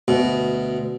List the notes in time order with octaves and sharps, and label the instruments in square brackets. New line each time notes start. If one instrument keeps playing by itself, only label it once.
[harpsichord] D2 B2